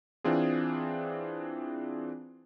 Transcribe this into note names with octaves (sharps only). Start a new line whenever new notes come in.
E3 C4 D4 F4 G#4